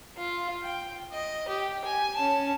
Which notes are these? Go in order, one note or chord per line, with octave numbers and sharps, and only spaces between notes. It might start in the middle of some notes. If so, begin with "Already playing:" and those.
F4
G5
D#5
G4
G#5
C#4 A5